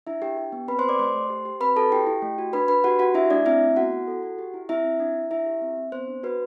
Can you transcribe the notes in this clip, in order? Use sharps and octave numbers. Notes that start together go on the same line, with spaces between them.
D4 E4 E5
D4 G4 G5
G4
B3
C4 B4 B5
C5 C6
G4
D5 D6
A3 C5 C6
A3
G4
G4
C4 B4 B5
F#4 A4 A5
E4 G4 G5
E4
A3
F#4
D4 B4 B5
D4 B4 B5
F#4 G4 F#5
F#4 G4 F#5
D4 E4 E5
A3 D4 D5
C4 E4 E5
A3
B3 F#4 F#5
E4
A4
F#4
G4
E4
C4 E4 E5
C4
D4
D4
E4 E5
G4
C4
C4
B3 C5
D4
F#4 B4